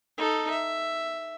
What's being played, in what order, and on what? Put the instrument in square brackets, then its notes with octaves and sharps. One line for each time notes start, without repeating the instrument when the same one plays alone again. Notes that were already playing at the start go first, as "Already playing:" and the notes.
[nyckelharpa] D#4 A4
E5